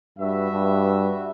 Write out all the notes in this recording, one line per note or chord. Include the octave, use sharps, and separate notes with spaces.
G2 F#4 B4 E5
G2